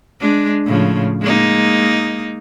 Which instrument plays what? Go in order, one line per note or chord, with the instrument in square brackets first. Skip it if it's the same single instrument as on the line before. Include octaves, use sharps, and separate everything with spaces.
[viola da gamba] G#3 D4
A2 C#3 F3
G#3 A#3 D#4